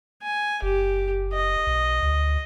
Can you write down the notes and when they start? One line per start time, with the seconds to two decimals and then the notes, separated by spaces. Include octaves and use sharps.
0.22 G#5
0.62 F#1 G4
1.33 D#5
1.67 B1
2.02 D2